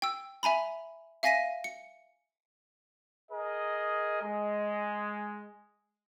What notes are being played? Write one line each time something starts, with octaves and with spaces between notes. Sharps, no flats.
G5 E6
E5 G#5 A#5 B5
E5 F5 G#5 A#6 B6 D#7
C#7
G#4 A#4 D#5
G#3